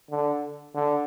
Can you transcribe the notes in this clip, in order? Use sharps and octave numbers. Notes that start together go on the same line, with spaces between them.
D3
D3